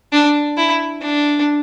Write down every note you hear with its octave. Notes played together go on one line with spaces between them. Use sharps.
D4
E4
D4